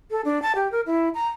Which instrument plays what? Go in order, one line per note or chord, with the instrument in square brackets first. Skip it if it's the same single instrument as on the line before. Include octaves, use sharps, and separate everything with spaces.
[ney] A4
D4
A5
G4
A#4
E4
A#5